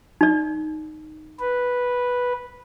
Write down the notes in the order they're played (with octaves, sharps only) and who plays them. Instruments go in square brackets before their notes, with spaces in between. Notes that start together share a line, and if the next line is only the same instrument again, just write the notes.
[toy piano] D#4 D5
[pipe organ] B4